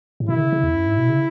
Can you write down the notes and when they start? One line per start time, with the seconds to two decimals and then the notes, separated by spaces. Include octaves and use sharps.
0.20 A2
0.29 B2 E4
0.36 D#3
0.41 C#3
0.53 C#3
0.64 E2
0.75 F#2
0.87 G#2
0.98 B2
1.09 C#3